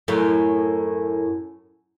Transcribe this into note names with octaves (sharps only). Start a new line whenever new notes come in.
F#2 A2